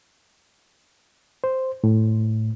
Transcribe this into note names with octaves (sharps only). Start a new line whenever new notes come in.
C5
A2